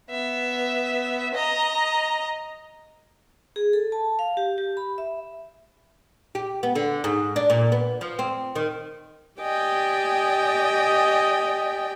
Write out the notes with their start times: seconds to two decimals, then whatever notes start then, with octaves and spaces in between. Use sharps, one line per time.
0.10 B3 E5
1.34 D#5 A#5
3.56 G#4
3.73 A4
3.92 A5
4.19 F5
4.37 G4
4.58 G4
4.77 B5
4.98 E5
6.35 G4
6.63 B3
6.75 D3
7.04 G#2
7.36 D4
7.50 A#2
7.72 B3
8.01 F3
8.19 C4
8.55 D#3
9.40 G4 D5 D#5 G5 G#5